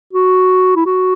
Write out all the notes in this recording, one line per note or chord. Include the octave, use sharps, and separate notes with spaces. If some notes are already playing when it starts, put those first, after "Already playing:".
F#4
E4
F#4